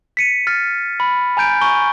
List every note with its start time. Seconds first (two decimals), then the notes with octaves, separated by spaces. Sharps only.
0.17 B6 C#7 D#7
0.47 F6 A6
1.00 B5
1.37 G#5 A#5 G6 D7
1.61 G#5 A#5 C#6 G7